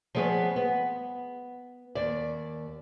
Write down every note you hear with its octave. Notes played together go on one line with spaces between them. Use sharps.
F3 G3 B3 G#4 B4 C#5
B3
D#2 D5